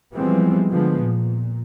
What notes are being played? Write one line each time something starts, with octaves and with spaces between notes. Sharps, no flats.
E3 F3 G3 G#3 B3 C4
D3 F3 G#3 B3
A#2